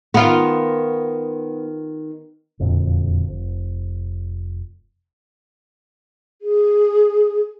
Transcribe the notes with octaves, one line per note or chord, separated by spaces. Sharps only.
D#3 B3 F4
E1 F2 A#2 D3
F1
G#4